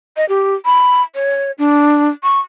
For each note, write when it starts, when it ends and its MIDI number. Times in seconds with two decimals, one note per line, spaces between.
0.17 0.25 75
0.29 0.55 67
0.65 1.02 83
1.15 1.52 73
1.58 2.09 62
2.23 2.40 85